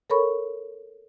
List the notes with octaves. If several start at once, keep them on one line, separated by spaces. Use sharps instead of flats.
A4 A#4 C#5 B5 C#6